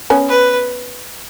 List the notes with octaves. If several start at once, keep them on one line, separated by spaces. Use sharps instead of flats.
B3 C#4
B4